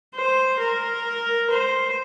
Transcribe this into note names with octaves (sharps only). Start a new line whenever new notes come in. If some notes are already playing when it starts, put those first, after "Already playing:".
C5
A#4
C5